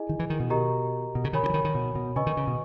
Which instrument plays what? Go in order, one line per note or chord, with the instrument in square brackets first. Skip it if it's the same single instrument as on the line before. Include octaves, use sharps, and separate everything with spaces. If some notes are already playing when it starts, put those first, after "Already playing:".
Already playing: [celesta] E4 G#4 D#5 G#5
[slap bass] D#3
E3
D#3
B2
[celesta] G4 A#4 D#5 A#5
[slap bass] B2
C#3
[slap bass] D#3 [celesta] A#4 C#5 G#5 B5
[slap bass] C#3
E3
D#3
D#3
B2
B2
[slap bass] C#3 [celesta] B4 D#5 G#5 C#6
[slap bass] D#3
C#3
B2